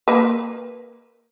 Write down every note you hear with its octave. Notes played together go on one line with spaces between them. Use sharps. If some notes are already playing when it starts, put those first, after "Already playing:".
A#3 B4